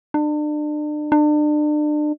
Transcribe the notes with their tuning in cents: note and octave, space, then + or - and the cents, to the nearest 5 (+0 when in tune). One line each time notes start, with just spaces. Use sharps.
D4 +35
D4 +35